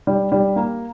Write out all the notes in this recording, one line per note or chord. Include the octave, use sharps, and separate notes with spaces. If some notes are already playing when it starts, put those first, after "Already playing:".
G3
G3
A#3